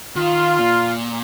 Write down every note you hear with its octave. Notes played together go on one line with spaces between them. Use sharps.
D#3 F4
A#2